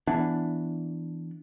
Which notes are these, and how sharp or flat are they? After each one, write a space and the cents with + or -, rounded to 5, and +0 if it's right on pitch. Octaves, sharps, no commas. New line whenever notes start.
E3 +0 B3 +5 D4 +0